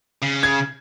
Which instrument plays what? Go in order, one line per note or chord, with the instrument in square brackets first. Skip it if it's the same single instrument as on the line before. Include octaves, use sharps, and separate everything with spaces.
[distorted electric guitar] C#3
[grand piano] G#6